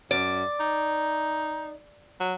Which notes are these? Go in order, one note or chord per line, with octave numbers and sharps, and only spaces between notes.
F#2 D5
D#4
F#3